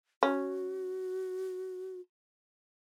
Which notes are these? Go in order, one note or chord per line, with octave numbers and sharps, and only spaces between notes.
C#4 F#4